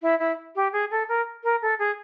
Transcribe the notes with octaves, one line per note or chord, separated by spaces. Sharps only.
E4
E4
G4
G#4
A4
A#4
A#4
A4
G#4